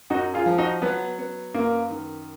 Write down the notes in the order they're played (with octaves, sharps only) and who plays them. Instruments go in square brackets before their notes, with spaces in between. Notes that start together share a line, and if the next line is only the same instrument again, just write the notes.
[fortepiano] F#2 [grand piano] D#4 F#4
[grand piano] F4 G#4
[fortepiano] F3
[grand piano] D#4 F#4
[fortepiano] F#3 [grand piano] B3
[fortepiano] B3
[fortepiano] F#2 [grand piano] A#3
[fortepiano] D#3